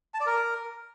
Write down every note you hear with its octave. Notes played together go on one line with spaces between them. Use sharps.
A5
D5
A#4